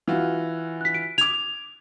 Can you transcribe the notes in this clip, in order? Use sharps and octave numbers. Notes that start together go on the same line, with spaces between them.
E3 F4 F#4
F#6 B6
D7
D6 G#6 F7